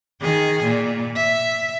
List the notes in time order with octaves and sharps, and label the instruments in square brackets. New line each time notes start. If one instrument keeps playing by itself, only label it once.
[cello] D#3 G#4
A#2
E5